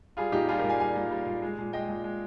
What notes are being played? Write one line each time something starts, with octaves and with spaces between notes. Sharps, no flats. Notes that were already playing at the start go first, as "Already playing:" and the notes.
G3 F4 G#4
A#2 D#4 G4
G3 F4 G#4
G4 A#4
A#2
F5 G#5
G3 F5 G#5
A#2
G3
A#2
G#3
A#2
G#3 D#5 G5
A#2
G#3